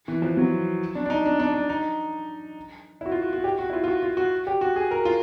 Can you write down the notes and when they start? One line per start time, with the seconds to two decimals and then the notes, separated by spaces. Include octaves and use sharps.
0.08 E3
0.22 F3
0.37 F#3
0.95 D4
1.06 D4
1.10 D#4
1.26 D4
1.39 D4
1.54 D4
1.69 D#4
3.01 E4
3.06 F#4
3.12 F4
3.22 F#4
3.33 F#4
3.44 G4
3.59 F#4
3.70 E4
3.73 F4
3.84 F4
3.88 F#4
4.03 F4
4.17 F#4
4.47 G4
4.61 F#4
4.76 G#4
4.91 A#4
5.05 F4